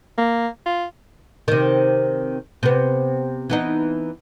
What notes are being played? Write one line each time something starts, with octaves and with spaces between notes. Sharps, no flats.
A#3
F4
C3 D#3
C3 B3
E3 B3 D#4